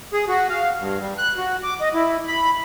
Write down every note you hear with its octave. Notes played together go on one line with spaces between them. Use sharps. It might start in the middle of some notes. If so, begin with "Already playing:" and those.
G#4
F#4
F5
G2
G3
F#6
F#4
D6
D#5
E4
B5